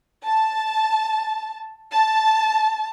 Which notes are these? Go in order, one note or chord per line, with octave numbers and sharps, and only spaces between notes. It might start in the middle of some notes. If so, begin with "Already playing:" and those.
A5
A5